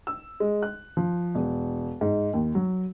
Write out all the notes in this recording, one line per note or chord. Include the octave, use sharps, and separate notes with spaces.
E6
G#3
F#6
F3
E1
G#2
D#2
F#3